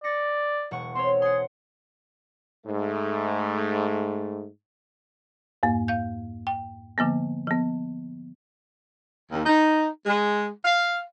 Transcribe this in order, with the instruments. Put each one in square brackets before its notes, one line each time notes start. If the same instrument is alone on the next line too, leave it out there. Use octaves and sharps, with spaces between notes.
[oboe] D5 [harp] A6 A#6 C#7
[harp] E1 F#5 C#6
[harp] C4 C5 C#5 [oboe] C6
[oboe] G#4 [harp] F#5 C6
[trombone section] G#2 A3
[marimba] F2 G#2 A#3
F5 G6
G5
D3 F3 A#3 B3
F3 B3
[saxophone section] D#2
D#4
G#3
F5